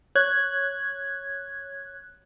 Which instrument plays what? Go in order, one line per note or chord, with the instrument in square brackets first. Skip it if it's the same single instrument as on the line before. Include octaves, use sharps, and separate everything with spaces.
[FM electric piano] C#5 F#6 G#6